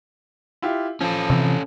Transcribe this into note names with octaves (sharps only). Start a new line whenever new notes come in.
E4 F4 G4
F3 C#4 A4
C3 E3